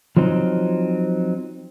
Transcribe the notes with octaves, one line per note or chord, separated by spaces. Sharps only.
F3 F#3 C4 D#4